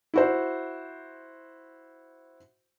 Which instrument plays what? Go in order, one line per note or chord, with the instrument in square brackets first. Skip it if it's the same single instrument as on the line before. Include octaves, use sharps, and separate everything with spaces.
[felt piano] E4 F#4 C5